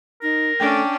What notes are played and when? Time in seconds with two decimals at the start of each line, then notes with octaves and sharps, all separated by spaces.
0.23 D#4 A#4
0.60 A3 C#4 D4 G5 A5 D6